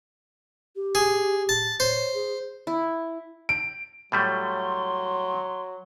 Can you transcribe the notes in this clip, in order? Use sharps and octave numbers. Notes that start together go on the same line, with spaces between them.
G4
G#4
A5
C5 C#5
G#4
E4
D7
A2 F#3 G3 A3 C6